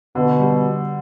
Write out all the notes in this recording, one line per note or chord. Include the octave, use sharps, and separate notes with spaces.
B2 D3
G3